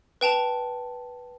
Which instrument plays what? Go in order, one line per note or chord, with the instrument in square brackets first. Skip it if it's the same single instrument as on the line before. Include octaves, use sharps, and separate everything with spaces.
[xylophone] B4 G5 A5 F7